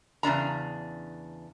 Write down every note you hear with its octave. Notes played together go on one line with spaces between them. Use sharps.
E2 C#3 D4 A#5